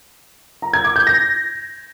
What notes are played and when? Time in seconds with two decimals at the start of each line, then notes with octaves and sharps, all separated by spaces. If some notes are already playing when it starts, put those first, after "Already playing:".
0.62 A#5
0.73 G#6
0.85 D6
0.96 G6
1.07 A#6